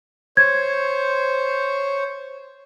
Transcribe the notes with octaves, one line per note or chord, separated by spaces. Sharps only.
C5 C#5 G#6